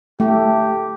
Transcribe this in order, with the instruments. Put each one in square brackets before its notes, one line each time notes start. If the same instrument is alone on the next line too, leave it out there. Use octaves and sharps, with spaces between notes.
[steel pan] A3 [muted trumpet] G4